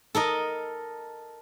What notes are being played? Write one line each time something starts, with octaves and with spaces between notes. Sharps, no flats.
A4 A#4 D#5